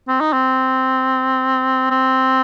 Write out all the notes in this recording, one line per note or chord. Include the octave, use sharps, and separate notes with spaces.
C4
D#4
C4
C4